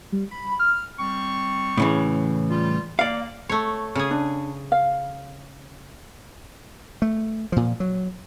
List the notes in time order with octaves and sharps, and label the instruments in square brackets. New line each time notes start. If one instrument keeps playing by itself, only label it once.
[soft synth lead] G3
B5
F6
[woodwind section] G3 C4 C#6
[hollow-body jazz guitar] A2 C#3 E3
[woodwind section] G3 F4
[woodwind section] A#3 [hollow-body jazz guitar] D5 F5
[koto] A3 C#5
C#3 G#4
[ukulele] D4
F5
[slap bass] A3
A#2 F3
F#3